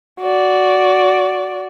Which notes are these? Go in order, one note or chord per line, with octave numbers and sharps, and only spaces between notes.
F#4 D5